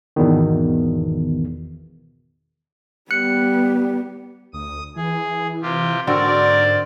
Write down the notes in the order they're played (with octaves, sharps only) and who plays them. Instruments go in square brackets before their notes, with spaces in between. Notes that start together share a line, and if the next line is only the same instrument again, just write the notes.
[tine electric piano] G#1 E2 B2 D#3
[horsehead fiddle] G3 B3 [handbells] F#6 C#7
[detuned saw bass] D2 [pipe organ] D#6
[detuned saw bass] E3 [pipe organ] G#4
[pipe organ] C3 F4 G4
[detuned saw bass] G#2 [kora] D3 C4 F#4 [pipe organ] A#4 [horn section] C5 D5